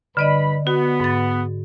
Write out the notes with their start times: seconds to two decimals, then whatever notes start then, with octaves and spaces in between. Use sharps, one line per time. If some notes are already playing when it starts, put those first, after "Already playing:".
0.17 G2 D3 B4 D5 D#5 B5
0.67 B3 F#4
1.00 G#2 A6